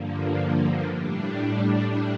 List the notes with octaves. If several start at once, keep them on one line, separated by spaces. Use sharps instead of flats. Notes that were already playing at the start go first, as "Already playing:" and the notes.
Already playing: G2 D3 F3 A#3
A2 G3 D4